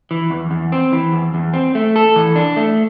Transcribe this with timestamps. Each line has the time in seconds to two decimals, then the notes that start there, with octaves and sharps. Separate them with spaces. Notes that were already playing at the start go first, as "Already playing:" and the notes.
0.11 E3
0.30 E2
0.51 E2
0.72 C4
0.92 E3
1.13 E2
1.34 E2
1.53 C4
1.75 A3
1.96 A4
2.16 E3
2.36 D4
2.56 A3